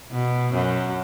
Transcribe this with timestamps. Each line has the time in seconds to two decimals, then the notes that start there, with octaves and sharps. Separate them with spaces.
0.11 B2
0.53 F#2